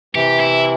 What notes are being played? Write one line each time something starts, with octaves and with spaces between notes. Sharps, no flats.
C3 E3 G4
E4